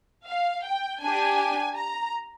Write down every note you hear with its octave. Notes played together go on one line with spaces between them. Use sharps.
F5
G5
D4 G4 G#5
A#5